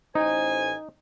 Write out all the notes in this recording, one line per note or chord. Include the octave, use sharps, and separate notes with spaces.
A1 D#4 C5 G#5